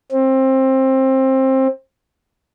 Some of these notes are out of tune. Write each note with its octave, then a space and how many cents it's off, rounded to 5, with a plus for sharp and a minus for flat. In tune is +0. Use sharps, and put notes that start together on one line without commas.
C4 +20